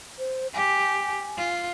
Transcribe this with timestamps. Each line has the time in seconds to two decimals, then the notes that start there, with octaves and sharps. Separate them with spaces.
0.19 C5
0.54 G4 G#5
1.37 F4